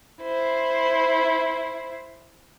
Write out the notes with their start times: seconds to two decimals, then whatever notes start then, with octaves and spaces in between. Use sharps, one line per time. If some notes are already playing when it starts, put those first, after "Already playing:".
0.22 E4 C5